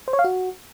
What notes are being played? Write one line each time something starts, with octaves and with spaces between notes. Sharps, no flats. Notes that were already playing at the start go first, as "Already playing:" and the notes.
C5
C#5
F5
F#4